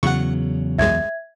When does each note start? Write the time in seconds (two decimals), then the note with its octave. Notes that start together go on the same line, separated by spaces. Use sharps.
0.03 E2 C#3 F#3 F#5 C#6
0.78 C2 F#2 G#3 E5 G#6